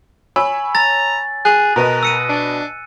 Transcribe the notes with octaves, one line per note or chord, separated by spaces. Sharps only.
C#5 G#5 B5 E6
A#5 A6
G#4 F#6
B2 A#4 B4 D#5
E6 C#7 D#7
D4